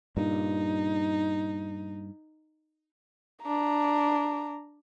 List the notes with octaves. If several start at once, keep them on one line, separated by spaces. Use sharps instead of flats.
G2 A#2 D#4
D4 A#5